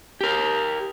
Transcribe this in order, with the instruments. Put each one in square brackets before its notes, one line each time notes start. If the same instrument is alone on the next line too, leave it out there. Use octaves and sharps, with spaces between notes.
[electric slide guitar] G4 A#4